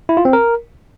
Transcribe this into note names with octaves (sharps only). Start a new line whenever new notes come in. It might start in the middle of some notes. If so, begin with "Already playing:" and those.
E4
F4
C4
A#4